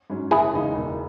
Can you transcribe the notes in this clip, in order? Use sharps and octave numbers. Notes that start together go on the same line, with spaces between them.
G#2 F#3 C#4
F#1 E4 G#4
E2 C#3 G#3 D#4
E1